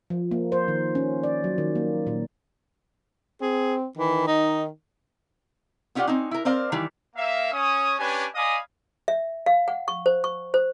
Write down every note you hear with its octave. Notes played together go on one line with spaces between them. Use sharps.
F3
A#3
C5
D#3
C#4
D5
F#3
D#3
A#3
A#2
C4 G#4
D#3 E3
D#4
B3 C#4 F4 G4 D5 F#5
C4 C#4 D#4
E4 A#4
C4 A#4 C5 D5 F5
D#3 E3 G3
A#3 E5 F5
C#4 D#6
C#4 D4 G4 B4 G#5
D5 D#5 F5 G#5 B5 D#6
E5
F5
F#5
C#6
C5
C#6
C5